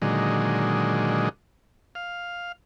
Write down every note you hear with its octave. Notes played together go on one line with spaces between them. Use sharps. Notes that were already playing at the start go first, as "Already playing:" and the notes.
A#2 D3 D#3 F#3 G#3
F5